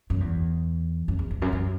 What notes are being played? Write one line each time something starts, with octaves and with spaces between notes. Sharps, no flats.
F#2
E2
F#2
E2
E2
F#2
F#2